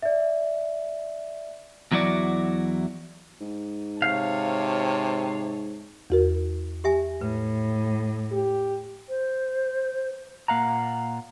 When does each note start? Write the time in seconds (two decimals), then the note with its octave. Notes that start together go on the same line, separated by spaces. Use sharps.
0.02 D5 E5
1.92 E2 F#3 E4 F#4 D5
3.40 G#2
4.02 C3 C#5 F5 A5
6.10 E2 F#4 A#4
6.84 G4 E5 G#5
7.21 A2 B4
8.32 G4
9.09 C5
10.48 A#2 A#3 F5 F#5 A#5